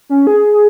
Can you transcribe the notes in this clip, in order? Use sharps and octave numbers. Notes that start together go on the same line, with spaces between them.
C#4
G#4
G#4